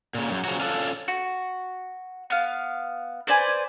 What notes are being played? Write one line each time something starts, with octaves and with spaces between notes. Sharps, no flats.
A#2 C#3
F#2
C#3 F3 F#3 F#4
C#4 D4 F4 A4
F#4
B3 F5
B4 C5 D5 G#5